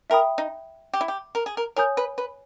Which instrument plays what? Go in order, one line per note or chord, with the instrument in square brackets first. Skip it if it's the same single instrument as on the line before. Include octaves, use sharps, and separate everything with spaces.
[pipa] A#4 [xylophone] E5 G5 B5 D#6
[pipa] D#4
G4
E4
G4
A#4
G#4
A#4
[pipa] A#4 [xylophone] C#5 G#5 D#6 G6
[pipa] B4
B4